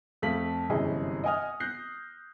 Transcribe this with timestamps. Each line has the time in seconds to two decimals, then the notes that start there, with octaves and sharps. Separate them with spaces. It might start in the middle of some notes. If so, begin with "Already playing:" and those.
0.22 F2 A3 A4 F5 B6 F#7
0.69 G1 F#2 C3 E3 G#4 D#5
1.24 D#5 F#5 G#5 D#6 F6
1.60 F#6 G6 A#6 C7